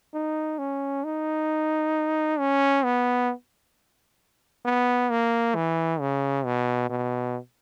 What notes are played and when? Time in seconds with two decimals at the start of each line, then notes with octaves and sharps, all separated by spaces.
0.14 D#4
0.59 C#4
1.04 D#4
2.39 C#4
2.84 B3
4.66 B3
5.10 A#3
5.55 E3
6.00 C#3
6.45 B2
6.90 B2